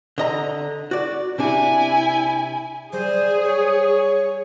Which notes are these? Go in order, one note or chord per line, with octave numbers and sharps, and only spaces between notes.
D3 D#5 A#5
F#4 D5
C3 D4 E4 G#5
G3 G#4 C5
C#5